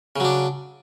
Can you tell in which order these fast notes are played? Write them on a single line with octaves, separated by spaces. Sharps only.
C#3 F#3 D4